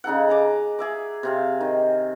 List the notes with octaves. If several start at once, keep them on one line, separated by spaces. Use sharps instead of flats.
C#3 D#4 A4 F#5
D#5 A#5 D6
G#4 E5 D6
C3 C4 F5
D#3